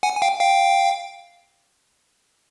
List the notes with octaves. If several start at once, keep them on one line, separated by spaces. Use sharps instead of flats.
F#5 G#5
G#5
F5 G5
F5 G5